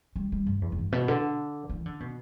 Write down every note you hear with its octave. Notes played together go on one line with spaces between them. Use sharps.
G3
G3
G2
E2
E2
G2
B2
D3
E3
D3
B2